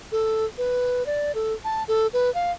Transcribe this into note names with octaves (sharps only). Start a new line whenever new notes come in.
A4
B4
D5
A4
A5
A4
B4
F5